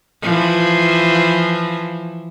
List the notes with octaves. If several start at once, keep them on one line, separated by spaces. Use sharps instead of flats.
E3 F3